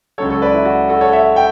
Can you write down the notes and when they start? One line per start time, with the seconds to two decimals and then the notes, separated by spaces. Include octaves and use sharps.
0.18 C#2 C#3 F#3 A4 C#5
0.30 A4 C#5
0.42 B4 D5
0.54 E4
0.65 F#4
0.89 F#4 A4
1.01 A4 C#5
1.12 C#5 E5
1.36 G5